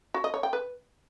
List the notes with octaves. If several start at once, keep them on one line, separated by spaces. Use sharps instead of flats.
F#4
D#5
C#5
G5
B4